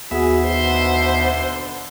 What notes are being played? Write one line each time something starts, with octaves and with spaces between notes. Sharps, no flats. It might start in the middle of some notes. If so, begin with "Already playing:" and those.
D#2 B3 F#4 G#4 E5
B2 D3 C5